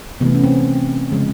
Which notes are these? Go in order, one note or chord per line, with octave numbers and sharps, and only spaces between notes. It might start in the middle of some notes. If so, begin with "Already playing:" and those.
C3 E3 A3 B3
C#4
C4
C#3 F3 G#3